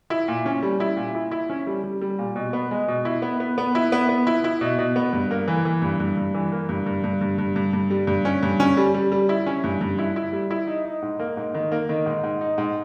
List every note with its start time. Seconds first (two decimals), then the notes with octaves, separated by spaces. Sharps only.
0.10 E4
0.28 A#2
0.46 C#4
0.63 G3
0.80 E4
0.97 A#2
1.15 E4
1.31 E4
1.50 C#4
1.67 G3
1.83 G3
2.01 G3
2.19 A#2
2.36 B2
2.53 B3
2.71 G#3
2.88 B2
3.05 E4
3.22 B3
3.40 B3
3.58 B3
3.75 E4
3.92 B3
4.09 B3
4.27 E4
4.44 E4
4.61 B2
4.79 B2
4.96 B3
5.13 G2
5.31 A#3
5.48 E3
5.65 E3
5.82 G2
6.00 G2
6.17 G2
6.35 E3
6.52 A#3
6.69 G2
6.86 G2
7.04 G2
7.21 G2
7.38 G2
7.56 G2
7.73 G2
7.90 G3
8.07 G2
8.25 C#4
8.43 G2
8.60 C#4
8.77 G3
8.94 G3
9.12 G3
9.29 E4
9.46 C#4
9.64 G2
9.81 G2
9.98 E4
10.16 E4
10.33 G3
10.51 E4
10.67 D#4
10.85 D#4
11.02 G#2
11.19 A#3
11.37 G#2
11.54 D#3
11.72 A#3
11.89 D#3
12.06 G#2
12.23 G#2
12.41 D#4
12.58 G#2